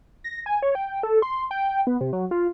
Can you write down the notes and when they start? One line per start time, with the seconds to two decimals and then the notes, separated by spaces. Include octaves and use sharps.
0.24 A#6
0.46 G#5
0.62 C#5
0.75 G5
1.03 A4
1.22 C6
1.51 G5
1.87 B3
2.01 C3
2.13 F#3
2.31 F4